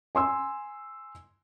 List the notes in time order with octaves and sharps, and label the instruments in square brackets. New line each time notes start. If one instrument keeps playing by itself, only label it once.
[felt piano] G#5 C6 E6